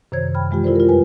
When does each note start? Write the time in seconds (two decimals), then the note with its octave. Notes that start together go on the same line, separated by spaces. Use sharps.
0.12 F#2 C3 D#3 C5 C#5 G#6
0.35 G5 B5 F6
0.51 E3 G#3 F4 G4
0.63 E4 F4 A4 A#4 C5 D5
0.75 F4 A#4
0.89 F2 G3 B4 G#5